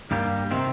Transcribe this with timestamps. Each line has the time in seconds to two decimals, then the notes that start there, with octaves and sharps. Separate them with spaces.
0.11 G2 G3 A#3 G4
0.51 C3 D#3 C4